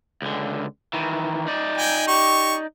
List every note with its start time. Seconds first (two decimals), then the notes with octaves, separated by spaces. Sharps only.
0.22 C#2 D3
0.93 D#3 E3
1.48 D#4 D5
1.78 G5 G#5
2.08 G4 C#6